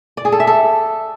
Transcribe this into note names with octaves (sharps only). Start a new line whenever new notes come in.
D5
G#4
A4
E5
A4